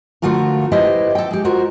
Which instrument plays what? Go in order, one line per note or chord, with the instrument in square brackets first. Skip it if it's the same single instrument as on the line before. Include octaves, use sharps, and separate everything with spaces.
[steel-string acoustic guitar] D3 F3 A3 F4 F#4 A#4
E4 G4 B4 C5 D#5 E5
A4 G5
G#3 G4
F4 F#4 A#4 C5